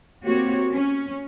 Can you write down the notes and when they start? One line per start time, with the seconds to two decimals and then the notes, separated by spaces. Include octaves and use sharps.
0.24 A#3 C4 F#4 G4 C#5
0.72 C#4